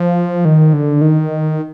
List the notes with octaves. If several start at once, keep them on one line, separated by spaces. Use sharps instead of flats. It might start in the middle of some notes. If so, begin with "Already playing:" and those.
Already playing: F3
D#3
D3
D#3